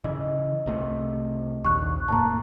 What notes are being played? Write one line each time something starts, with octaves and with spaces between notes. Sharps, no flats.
C#3 E3 D#5
C2 C3 A3
A#1 D#2 C#6 F#6
E1 A2 A#3 A5 A#5